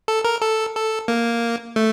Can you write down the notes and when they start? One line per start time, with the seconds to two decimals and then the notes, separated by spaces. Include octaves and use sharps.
0.08 A4
0.25 A#4
0.42 A4
0.75 A4
1.08 A#3
1.76 A3